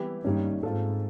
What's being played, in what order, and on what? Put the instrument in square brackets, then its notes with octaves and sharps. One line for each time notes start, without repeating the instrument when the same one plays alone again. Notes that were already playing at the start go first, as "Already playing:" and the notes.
Already playing: [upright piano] E3 G3 B3 E4 G4
[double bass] G2 [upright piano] D#3 G3 A#3 C#4
[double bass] G#2 [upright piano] C4 F4 A4